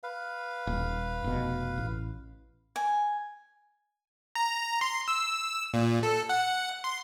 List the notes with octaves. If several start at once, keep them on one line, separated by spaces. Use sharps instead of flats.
B4 F5
D#1
F1 B2
A1
G#5
A#5
C6
E6
A#2
A4
F#5
C6